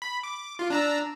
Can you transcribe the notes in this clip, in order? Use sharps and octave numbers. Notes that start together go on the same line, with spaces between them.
B5
D6
F4
D4 A#5 E6